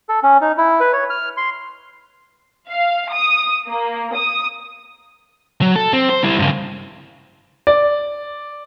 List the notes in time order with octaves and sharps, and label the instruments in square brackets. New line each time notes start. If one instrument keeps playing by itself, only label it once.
[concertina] A4
C#4
D#4
E4
B4
C#5
F6
C6
[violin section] F5
D#6
A#3
D#6
[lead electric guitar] F#3
A4
C4
C5
G3 E4
G2 C#3
[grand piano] D5